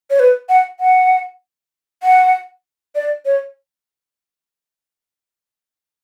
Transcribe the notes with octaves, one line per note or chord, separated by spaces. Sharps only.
C#5
B4
F#5
F#5
F#5
D5
C#5